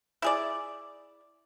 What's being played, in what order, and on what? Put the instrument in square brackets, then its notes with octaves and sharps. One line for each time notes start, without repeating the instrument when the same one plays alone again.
[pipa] E4 G#4 D5